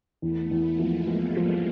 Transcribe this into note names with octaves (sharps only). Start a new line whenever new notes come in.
E2 A3 B3
E2
G#3 A#3
F3
F3 G3 A3
F3